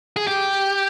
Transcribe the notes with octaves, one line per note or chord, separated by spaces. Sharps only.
G#4
G4